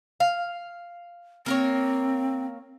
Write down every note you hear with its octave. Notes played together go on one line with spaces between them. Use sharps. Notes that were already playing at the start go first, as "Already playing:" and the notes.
F5
A#3 C4 A#4 C#5